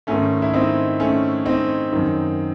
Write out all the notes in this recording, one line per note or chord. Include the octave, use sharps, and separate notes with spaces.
G#2 D#3 A3 C#4
E4
C4 D#4
A3 C#4
C4 D#4
F#2 D#3